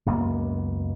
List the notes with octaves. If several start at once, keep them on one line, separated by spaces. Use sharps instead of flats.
C#2 F#2 A#3 B3